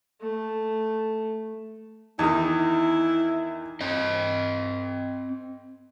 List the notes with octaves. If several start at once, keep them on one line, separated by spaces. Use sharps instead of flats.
A3
E2 D#3 D#4 E4
C4 D#5